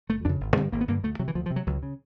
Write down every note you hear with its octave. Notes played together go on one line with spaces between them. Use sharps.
F#1 A3
F2 C#3 D4
G#1
G2 D3 C4
G#1 A#3
B3
G2 D3 A#3
D2 A3
C3 F#3
E3
D2 F3
F3
C3
F#3
C#2 F#3
C#3